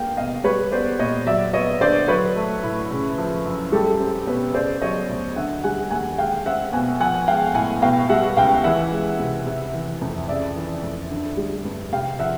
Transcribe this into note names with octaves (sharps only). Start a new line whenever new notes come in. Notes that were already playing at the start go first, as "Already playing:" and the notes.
Already playing: G2 A#3 F5 G5
B2 D#5 F5
G3 B4 C#5
B3 C5 D5
A#2 C#5 D#5
F#3 D5 E5
B3 C#5 D#5
D3 C5 D5
F#3 B4 C#5
A3
A2
C#3
F3
F#2
G3 G4 A4
C4
B2 B4 C#5
C#3 C5 D5
F#3 C#5 D#5
D2
D3 E5 F#5
G3 F#5 G#5
D#2 F#5 G#5
G#3 F5 G5
C4 E5 F#5
B2 F#5 G#5
F3 F#5 G#5
G#3 F5 G5
A2 F#5 G#5
B2 F5 G5
G3 E5 F#5
C#2 F5 G5
E3 E5 F#5
G#3
C3
C3
E3
F2
C#3 D5 E5
E3
F2
D3
G3
G2
C3 F5 G5
F3 E5 F#5